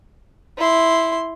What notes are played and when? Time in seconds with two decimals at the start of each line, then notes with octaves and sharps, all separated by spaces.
0.58 E4 C6